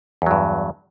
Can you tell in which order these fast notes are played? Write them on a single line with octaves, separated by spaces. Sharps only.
E2 F#3 G2